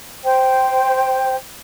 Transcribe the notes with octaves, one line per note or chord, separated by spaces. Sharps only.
C5 G5